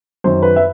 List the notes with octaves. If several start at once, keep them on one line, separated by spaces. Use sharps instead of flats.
F#2 D#3 C5
B4
E5